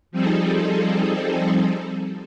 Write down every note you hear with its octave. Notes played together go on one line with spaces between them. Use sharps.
F3 G3 C4 D#4 G#4 A4